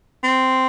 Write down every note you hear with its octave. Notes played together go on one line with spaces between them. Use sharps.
C4